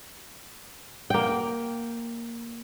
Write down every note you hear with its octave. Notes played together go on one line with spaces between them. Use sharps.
A#3 G5